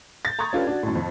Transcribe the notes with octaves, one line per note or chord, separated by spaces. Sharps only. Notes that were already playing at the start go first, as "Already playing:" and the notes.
G6 A6
A#5 C6 C#6 D#6 G#6
C#4 D4 F4 G4 A4 B4
D4 F#4
F#2 A2
F2